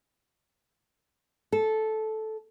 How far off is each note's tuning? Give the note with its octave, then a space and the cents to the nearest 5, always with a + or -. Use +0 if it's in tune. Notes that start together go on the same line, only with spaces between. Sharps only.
A4 -10